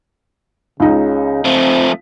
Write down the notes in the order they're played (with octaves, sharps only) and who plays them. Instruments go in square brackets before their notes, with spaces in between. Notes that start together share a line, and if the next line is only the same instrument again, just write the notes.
[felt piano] C#2 D#4 [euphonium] C#3
[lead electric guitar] F3 A3 [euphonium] C4